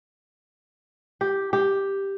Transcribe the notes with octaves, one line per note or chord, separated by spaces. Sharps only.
G4
G4